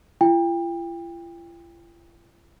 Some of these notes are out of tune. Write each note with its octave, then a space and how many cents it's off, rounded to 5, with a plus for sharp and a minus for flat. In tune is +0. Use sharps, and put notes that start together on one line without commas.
F4 -45 G5 +30